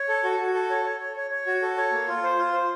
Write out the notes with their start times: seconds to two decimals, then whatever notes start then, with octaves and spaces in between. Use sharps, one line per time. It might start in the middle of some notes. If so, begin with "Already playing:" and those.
Already playing: C#5
0.09 A4
0.24 F#4
0.40 F#4
0.54 A4
0.70 C#5
0.85 C#5
1.01 C#5
1.16 C#5
1.31 C#5
1.47 F#4
1.62 A4
1.77 C#5
1.92 A#3
2.07 F4
2.23 C5
2.38 F4
2.53 C5